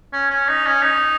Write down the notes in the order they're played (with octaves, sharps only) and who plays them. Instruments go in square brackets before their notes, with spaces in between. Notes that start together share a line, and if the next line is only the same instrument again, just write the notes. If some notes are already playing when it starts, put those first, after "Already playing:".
[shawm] C#4
C#4
D#4
C#4
D#4